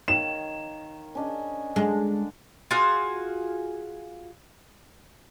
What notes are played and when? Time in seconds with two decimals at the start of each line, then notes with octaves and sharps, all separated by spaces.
0.08 D#3 C#5 F5 E7
1.15 C#4 D4 D#5
1.76 D3 G#3 D4
2.71 F4 F#4 G#4 F5